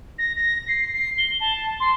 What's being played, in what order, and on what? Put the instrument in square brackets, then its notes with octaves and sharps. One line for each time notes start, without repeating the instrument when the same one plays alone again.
[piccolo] A#6
A#6
C7
C7
G7
A5
C6